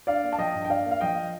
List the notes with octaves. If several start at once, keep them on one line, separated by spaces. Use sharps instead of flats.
D4 D5 F5
A#3
A5
F3 D#5 G5
G2
G5
D4 D5 F5
A#3
F5
F3 D#5 G5